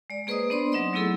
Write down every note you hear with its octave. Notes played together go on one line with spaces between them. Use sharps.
G#3 D5
A#3 G#4 B4 C5 D#5 D#6
B3 D4 C5 D5 C6
F#3 C4 D#4 D#5 C6
F#3 A3 B3 E4 G#4 A4